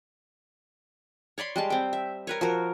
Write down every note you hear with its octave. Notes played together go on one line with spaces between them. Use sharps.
C#5 D5 B5 C6
G3 G#3 A5
C4 G5
E5
A#4 B4 C#5
F3 F#4 A#4